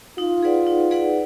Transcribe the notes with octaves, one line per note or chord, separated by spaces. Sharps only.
D#4 F4
G#4 B4 D5 F#5
D#4
G#4 B4 D5 F#5